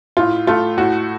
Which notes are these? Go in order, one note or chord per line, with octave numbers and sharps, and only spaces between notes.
A2 F4
A3 F4
A2 F#4